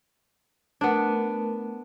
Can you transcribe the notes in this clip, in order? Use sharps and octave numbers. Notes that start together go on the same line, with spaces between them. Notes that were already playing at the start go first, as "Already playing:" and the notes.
A3 B3 D4 A#4